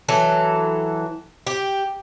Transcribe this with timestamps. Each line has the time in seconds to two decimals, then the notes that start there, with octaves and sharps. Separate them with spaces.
0.09 E3 F#3 A4
1.47 G4